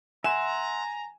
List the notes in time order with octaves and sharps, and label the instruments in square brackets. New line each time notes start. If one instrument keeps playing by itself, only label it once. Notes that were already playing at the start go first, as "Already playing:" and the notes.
[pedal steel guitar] E5 F#5 C6 [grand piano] G#5 [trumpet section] A#5 [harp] E7